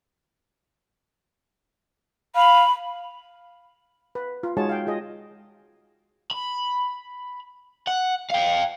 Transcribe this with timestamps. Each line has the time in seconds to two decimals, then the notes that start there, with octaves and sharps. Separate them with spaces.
2.36 F5 B5
4.15 B4
4.43 F4
4.57 G#3 D#4 F#4 G#4 C#5 A5
4.69 F5 G5
4.87 F4 G#4 D#5
6.31 B5
7.87 F#5
8.30 F5 G5